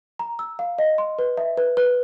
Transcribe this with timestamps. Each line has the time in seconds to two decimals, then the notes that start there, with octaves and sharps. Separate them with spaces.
0.19 A#5
0.39 E6
0.59 F5
0.79 D#5
0.98 C6
1.19 B4
1.37 E5
1.57 B4
1.77 B4